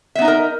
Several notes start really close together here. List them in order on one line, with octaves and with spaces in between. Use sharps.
E5 B3 D#4 D#5 A#4